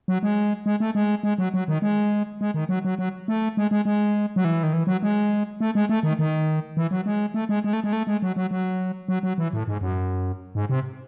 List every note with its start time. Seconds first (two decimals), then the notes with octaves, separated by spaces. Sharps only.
0.08 F#3
0.23 G#3
0.66 G#3
0.80 A3
0.95 G#3
1.23 G#3
1.38 F#3
1.54 F#3
1.68 D#3
1.82 G#3
2.41 G#3
2.54 D#3
2.69 F#3
2.85 F#3
2.99 F#3
3.28 A3
3.57 G#3
3.71 G#3
3.85 G#3
4.36 F#3
4.44 E3
4.63 D#3
4.73 E3
4.87 F#3
5.03 G#3
5.60 A3
5.75 G#3
5.89 A3
6.03 D#3
6.19 D#3
6.77 E3
6.91 F#3
7.06 G#3
7.34 A3
7.49 G#3
7.64 G#3
7.73 A3
7.84 G#3
7.93 A3
8.07 G#3
8.22 F#3
8.36 F#3
8.51 F#3
9.08 F#3
9.23 F#3
9.38 E3
9.53 A2
9.68 G#2
9.81 F#2
10.55 G#2
10.69 C3